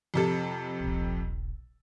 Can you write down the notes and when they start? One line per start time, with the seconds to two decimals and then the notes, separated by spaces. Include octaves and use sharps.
0.14 F2 C3 A4
0.80 D#1 A#1